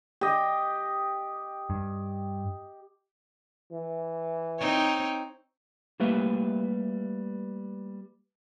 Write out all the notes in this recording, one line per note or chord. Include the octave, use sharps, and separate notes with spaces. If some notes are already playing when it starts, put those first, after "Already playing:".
G4 D#5
G2
E3
C4 D#4 C#5
G3 A3 A#3 G4 B4 E5